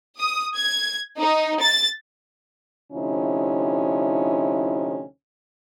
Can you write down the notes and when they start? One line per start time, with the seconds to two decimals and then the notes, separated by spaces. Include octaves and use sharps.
0.19 D#6
0.57 G#6
1.19 D#4
1.63 A6
2.92 D2 C3 F3 C#4 D#4 E4